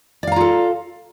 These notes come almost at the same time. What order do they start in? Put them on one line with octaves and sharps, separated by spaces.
D5 F5 A#5 F4 A4